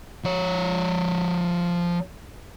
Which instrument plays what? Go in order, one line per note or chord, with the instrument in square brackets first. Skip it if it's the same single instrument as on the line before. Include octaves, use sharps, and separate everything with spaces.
[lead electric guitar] F3 C#5